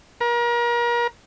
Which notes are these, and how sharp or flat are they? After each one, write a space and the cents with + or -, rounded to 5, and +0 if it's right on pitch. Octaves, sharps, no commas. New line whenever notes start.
A#4 +35